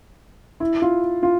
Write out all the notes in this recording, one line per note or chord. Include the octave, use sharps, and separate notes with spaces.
E4
F4
F4